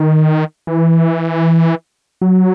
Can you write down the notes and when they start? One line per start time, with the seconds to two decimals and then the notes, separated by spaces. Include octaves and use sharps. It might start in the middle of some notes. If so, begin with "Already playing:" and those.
Already playing: D#3
0.67 E3
2.21 F#3